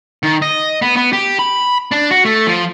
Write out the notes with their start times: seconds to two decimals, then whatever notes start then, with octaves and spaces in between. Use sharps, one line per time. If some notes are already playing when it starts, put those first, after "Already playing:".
0.23 D#3
0.42 D#5
0.82 B3
0.96 B3
1.13 G4
1.39 B5
1.91 D4
2.11 F#4
2.25 A3
2.47 F3